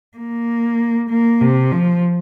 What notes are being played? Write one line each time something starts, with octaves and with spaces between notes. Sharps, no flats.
A#3
A#3
C3
F3